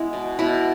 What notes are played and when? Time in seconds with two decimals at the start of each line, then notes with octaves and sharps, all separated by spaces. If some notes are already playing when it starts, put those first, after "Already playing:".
Already playing: G#3 B3 E4
0.13 B2
0.39 B2 E4